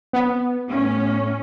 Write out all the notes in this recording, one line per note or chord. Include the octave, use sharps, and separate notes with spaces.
B3
A2 C#4